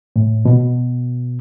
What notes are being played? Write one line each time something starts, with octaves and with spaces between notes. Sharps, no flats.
A2
B2